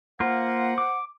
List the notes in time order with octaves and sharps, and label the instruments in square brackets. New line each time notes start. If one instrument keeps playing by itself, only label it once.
[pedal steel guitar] A#3 F4 [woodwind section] C5 F#5
[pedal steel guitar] D6